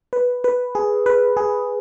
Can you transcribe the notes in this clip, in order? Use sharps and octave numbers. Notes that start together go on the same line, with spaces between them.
B4
B4
G#4
B4
G#4